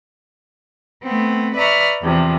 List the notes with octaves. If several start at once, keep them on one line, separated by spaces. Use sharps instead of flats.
A3 B3 C4
B4 D5 E5 A#5 C#6 F6
E2 C3 F3